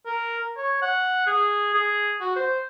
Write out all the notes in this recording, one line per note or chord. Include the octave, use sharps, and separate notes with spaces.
A#4
C#5
F#5
G#4
G#4
F#4
C5